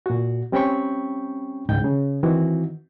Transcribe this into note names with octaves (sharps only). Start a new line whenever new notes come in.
A#2 F#4
G3 C4 C#4 G5 B5 C#6
C#2 G#2 G5 G6
C#3
D#3 E3 C4 E4 F#4